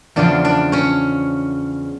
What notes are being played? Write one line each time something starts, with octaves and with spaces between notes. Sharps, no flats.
E2 C#3 F3 D4 D5
D4 D5
C#4 C#5